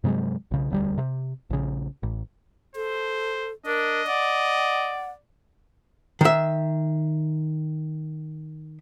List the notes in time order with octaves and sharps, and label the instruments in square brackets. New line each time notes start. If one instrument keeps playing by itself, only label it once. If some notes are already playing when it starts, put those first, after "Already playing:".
[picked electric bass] G2 C3 F#3 G#3
B1 C#3
E1 D2 E3 G3
C3
A#1 C#3
A1
[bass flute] A4 [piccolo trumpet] C5
[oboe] D4 [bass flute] A#4 [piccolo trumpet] D#5
[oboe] D5 [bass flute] F#5
[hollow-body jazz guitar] D#3 E5